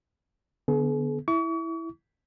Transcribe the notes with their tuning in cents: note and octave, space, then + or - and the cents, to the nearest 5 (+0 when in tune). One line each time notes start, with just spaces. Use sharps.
D3 +0 B3 +0 G#4 +45
E4 +0 C#6 +40